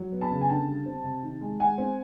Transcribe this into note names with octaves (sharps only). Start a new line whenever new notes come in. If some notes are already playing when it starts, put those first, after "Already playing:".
Already playing: F#3
B3
A5 B5
C#3
G#5
D3 G5 A5
G3
C4
C3
D#3
G#3
G#3 F#5 G#5
C4